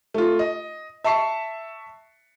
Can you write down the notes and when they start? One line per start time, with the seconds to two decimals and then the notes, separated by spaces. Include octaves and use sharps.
0.14 A3 F4
0.39 D#5
1.04 E5 A5 C#6 C7 C#7